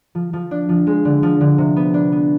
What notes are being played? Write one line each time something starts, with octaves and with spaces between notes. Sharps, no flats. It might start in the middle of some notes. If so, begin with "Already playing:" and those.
F3
F3
D4
F3
G#3
D3
F3
D3
C3
B3
D4
B3